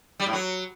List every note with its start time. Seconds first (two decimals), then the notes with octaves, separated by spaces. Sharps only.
0.20 G3
0.26 A2
0.33 F#3